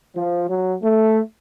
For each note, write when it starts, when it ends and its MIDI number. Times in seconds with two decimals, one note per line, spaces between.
0.15 0.42 53
0.48 0.73 54
0.82 1.19 57